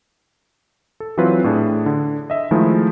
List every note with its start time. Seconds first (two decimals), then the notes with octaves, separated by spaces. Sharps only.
1.00 A4
1.17 E3 F#3 C4 F4 B4
1.44 A2 D4 G#4
1.86 D3
2.30 D#5 E5
2.51 D#3 F3 G#3 A3 E4